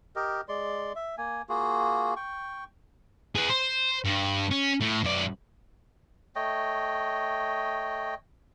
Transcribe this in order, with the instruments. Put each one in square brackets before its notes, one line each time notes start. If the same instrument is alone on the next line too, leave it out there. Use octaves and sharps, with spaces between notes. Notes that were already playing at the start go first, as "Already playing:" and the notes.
[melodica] G4 A#4 D#5
G#3 D5 C6
E5
A#3 G#5
A#3 F4 F#4 G#4
G5 C#6
[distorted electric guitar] G#4 B4
C5
G2
C#4
A2
F#2 D5
[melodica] A3 C#5 D#5 G5